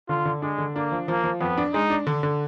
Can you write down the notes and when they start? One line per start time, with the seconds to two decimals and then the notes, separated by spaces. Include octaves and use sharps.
0.09 D3 F4
0.25 D3
0.42 G#3 D4
0.58 D3
0.75 A#3 D4
0.92 F3
1.08 F3 A#3
1.24 F3
1.41 F2 B3
1.58 D4
1.73 G#3 D#4
1.90 D4
2.07 D3
2.23 D3